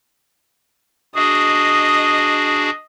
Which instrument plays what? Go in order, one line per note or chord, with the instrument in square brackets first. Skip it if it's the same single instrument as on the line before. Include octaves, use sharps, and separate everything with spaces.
[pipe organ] D4 F#4 G#4 [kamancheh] D#5